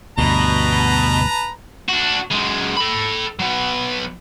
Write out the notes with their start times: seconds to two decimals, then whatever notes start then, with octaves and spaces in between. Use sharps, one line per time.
0.18 D2 G2 B2 B4 A5 A#5
1.89 D4 F#4
2.31 F#2 G#3
2.77 A4 B5
3.40 F#3 B3